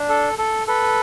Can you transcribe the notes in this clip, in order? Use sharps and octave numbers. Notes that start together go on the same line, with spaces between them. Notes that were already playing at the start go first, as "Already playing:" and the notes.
Already playing: D4
A4
A4
A4 B4